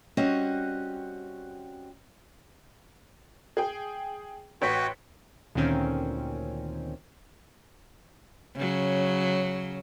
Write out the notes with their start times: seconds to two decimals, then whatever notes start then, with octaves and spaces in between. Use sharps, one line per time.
0.17 G3 C4 C#4 F#4 D#5 F#5
3.57 G#4 G5
4.62 A1 F#4 B4 C#5 G5 B6
5.55 D2 A#2 D#3 C4 C#4
8.56 C#3 F#3